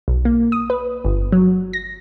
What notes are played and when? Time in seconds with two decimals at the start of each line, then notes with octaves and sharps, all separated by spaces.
0.08 B1
0.25 A#3
0.52 D#6
0.70 B4
1.05 G1
1.32 F#3
1.73 A#6